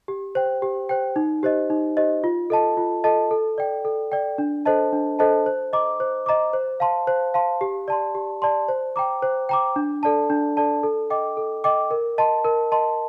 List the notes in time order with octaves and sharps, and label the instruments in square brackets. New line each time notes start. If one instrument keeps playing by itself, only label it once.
[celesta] G4
C5 G5
G4
C5 G5
D#4
G4 C5 D#5
D#4
G4 C5 D#5
F4
A4 D#5 A5
F4
A4 D#5 A5
A4
D5 G5
A4
D5 G5
D4
A4 C5 D#5 A5
D4
A4 C5 D#5 A5
C5
D#5 A#5 D6
C5
D#5 A#5 D6
C5
F5 A5 C6
C5
F5 A5 C6
G4
D5 A5 C6
G4
D5 A5 C6
C5
G5 A#5 D6
C5
G5 A#5 D6
D4
A4 D5 A5
D4
A4 D5 A5
A4
D#5 G5 D6
A4
D#5 G5 D6
A#4
D#5 A5 C6
A#4
D#5 A5 C6